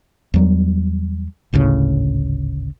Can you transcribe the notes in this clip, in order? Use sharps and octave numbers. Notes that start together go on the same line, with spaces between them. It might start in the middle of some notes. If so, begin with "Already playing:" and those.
E2 F#3 G3
G#1 D2 A2 C#3